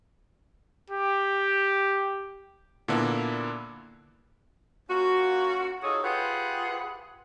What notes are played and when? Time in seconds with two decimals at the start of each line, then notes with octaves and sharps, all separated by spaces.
0.90 G4
2.88 A#2 D3 A#3 B3 D4 E4
4.89 A#3 C#4 F4 F#4
5.83 D#4 F4 F#4 G#4 A4 C#5
6.04 F4 G4 G#4 B4 C5 F#5